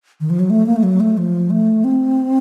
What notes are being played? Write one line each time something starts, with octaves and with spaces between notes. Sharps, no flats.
D#3
F3
F#3
A3
A#3
A3
F#3
A3
F3
A3
C4